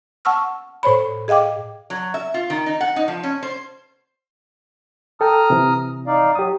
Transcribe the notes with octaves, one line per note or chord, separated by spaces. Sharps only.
F#5 A5 C#6 E6 F6
A2 C5 C#5 B5
G#4 D#5 F5 G5 D6
F#3
E5
F4
D#3
D#4
F#5
D#4
F3
C#4
C5
A4 G5 A#5 D#6 F6
C3 E3
D#4 D5 F5
F#3 G4 D#6